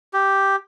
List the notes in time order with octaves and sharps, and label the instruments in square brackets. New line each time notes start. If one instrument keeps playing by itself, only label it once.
[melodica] G4